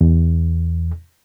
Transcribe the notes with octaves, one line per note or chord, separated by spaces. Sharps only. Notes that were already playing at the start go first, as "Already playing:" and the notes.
E2